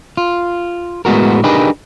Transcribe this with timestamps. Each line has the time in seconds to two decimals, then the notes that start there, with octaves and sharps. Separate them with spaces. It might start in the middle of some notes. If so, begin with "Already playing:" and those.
0.17 F4
1.05 A2 G#3 B3 F#4 A#4
1.44 D4 D#4 G4 G#4 A#4 B4